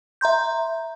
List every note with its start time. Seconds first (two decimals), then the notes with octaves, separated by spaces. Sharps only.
0.21 E5 A#5 C6 G6